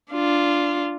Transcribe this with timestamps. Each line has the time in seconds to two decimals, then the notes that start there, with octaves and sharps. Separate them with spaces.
0.12 D4 F4